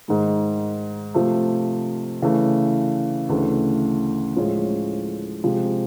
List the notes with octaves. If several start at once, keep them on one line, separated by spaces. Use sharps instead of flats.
G#2 D#3 G#3
C3 F3 A3
C#3 E3 A3
D2 C#3 E3 A3
A2 F3 G#3 C#4
C3 F3 G#3